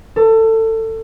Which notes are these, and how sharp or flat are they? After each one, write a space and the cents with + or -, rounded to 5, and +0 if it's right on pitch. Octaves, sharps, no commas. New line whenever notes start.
A4 +25